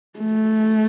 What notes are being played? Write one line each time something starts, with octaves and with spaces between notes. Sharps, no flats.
A3